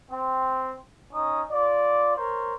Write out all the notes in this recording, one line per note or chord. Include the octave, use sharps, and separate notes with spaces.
C4
C#4 D#4 D#6
F4 D5
A#4 C5 C#5